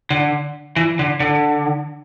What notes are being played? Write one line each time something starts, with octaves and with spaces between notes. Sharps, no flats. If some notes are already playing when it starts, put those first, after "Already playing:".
D3
E3
D3
D3